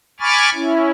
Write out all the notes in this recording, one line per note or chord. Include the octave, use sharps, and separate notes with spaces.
G#5 B5 C#6 D6 F6 A6
C#4 E4